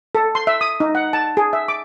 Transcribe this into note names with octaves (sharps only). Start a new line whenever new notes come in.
A4
C6
E5
D#6
D#4
F#5
A5
G#4
E5
D6